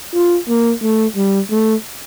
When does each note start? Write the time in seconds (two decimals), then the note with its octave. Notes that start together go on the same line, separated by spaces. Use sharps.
0.14 F4
0.49 A#3
0.83 A3
1.16 G3
1.51 A3